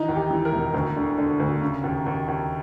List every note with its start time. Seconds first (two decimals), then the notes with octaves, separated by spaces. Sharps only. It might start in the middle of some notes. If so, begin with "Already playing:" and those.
Already playing: D#3 E3 D#4
0.08 D#2
0.16 G4
0.31 E3
0.45 A#4
0.52 E1
0.74 D2
0.96 D3
1.18 D3
1.40 D2
1.61 C#3
1.84 D#2
2.06 D#2
2.28 D#2